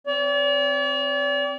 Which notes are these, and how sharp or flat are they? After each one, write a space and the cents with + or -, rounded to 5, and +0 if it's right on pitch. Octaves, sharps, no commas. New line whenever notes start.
C4 +0 D5 -45